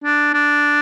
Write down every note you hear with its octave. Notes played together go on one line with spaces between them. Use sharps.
D4
D4